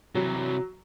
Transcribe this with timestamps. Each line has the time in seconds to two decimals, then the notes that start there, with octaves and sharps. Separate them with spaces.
0.15 C3 E3 F#3